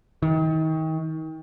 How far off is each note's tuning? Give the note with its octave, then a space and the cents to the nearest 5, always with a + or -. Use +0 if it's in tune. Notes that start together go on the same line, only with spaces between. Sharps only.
D#3 +35